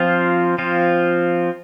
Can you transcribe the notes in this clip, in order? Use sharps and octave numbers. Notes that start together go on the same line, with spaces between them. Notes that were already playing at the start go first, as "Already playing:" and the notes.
Already playing: F3 C4 F4
F3 C4 F4